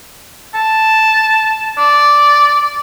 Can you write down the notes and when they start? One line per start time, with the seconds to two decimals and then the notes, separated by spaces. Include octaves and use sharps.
0.55 A5
1.78 D5